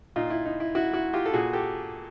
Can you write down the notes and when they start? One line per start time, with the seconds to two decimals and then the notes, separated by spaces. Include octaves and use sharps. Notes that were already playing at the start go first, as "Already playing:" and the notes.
0.16 A#2 D#4 F4
0.30 E4
0.46 D#4
0.60 E4
0.75 E4 F#4
0.94 E4 F#4
1.13 F4 G4
1.26 A4
1.33 A#2 F#4 G#4
1.53 G4 A4